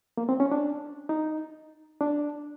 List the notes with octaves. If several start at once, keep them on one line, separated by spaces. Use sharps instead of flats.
A#3
C4
C#4
D4
D#4
D4